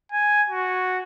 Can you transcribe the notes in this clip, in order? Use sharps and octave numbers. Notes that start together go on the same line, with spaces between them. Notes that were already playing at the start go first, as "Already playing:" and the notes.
G#5
F#4